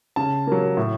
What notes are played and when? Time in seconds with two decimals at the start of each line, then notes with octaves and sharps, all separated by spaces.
0.16 C#3 A5
0.47 F#3 A#3
0.77 A2